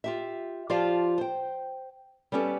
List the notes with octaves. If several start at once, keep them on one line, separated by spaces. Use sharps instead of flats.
F4 G4 E5
F3 F4 G4 D5 F5 A5
C5 G5
G3 B3 C#4 G4 A4